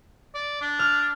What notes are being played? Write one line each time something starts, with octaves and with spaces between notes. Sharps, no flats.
D5
D4
F6